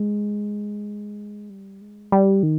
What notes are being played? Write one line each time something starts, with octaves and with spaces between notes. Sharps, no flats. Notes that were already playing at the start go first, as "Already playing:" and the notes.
Already playing: G#3
G3
G#3
G3
D#3